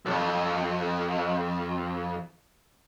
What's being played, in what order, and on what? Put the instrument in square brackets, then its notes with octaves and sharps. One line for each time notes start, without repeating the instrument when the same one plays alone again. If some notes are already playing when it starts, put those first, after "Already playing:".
[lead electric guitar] B1 F2